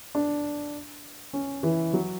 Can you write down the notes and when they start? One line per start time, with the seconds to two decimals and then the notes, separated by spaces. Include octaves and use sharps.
0.15 D4
1.33 C#4
1.63 E3
1.93 F#3